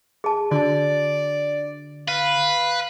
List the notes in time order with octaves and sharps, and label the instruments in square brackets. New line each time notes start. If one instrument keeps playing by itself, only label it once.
[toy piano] G#4 A5
[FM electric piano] D3 [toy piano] F#4 A5 [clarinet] D5
[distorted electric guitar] B4 [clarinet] F5